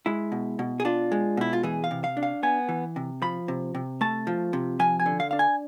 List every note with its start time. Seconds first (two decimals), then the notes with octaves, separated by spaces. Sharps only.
0.06 G#3 E4
0.32 B2
0.59 B2
0.80 G#4
0.85 D4 F4
1.12 G#3
1.37 B2 E4
1.53 F4
1.63 E3 G#4
1.84 F5
1.91 C3
2.04 F5
2.17 D4
2.23 F5
2.43 B3 G#5
2.69 E3
2.96 C3
3.22 F3 B5
3.48 C3
3.75 C3
4.01 A3 A5
4.27 F3
4.53 C3
4.79 F3 G#5
5.00 G#5
5.06 D3
5.20 F5
5.31 D4 F5
5.39 G#5